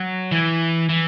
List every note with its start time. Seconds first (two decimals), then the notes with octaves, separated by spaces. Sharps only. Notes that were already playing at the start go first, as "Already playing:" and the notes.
Already playing: F#3
0.32 E3
0.89 E3